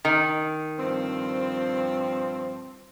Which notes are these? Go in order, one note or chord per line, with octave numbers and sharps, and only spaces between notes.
D#3
G2 F3 C4